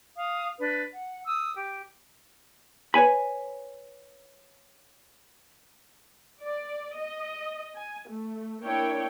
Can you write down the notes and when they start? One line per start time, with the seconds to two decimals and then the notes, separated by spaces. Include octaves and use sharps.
0.16 F5 D#6
0.59 D4 B4
0.93 F#5
1.26 D#6 E6
1.56 G4
2.94 B4 C#5 G#5 B5
6.43 D5
6.97 D#5
7.75 G#5
8.09 A3
8.63 A#3 D4 E4 A#4 C#5 G5